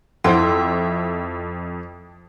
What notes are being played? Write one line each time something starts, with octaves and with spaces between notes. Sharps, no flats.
F2 E4 C5 E5 F#5 G5 C6